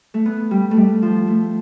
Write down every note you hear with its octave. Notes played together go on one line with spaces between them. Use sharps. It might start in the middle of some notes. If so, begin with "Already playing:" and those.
A3
B3
G3
A3
G3
F3
A3